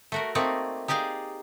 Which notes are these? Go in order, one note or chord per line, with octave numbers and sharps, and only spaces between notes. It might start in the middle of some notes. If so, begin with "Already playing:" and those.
A3 F#4 A#4
A3 A#3 C4 D#4 C#5 D5
D#4 G4 G#4 D5 F5